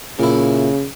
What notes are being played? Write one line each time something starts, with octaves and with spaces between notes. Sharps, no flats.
A#2 C#3 E4